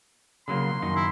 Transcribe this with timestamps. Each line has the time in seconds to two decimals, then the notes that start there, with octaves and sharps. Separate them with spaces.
0.48 C#3 F#3 A#3 C6
0.82 F#2 D#3 D#4
0.96 E4